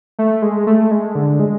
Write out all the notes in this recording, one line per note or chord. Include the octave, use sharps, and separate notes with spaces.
A3
G#3
A3
G#3
D3
G#3